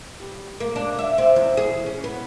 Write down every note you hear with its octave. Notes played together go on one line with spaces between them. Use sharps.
G3
A#3
D4
E5
C4
E2
G#4
C#4
B3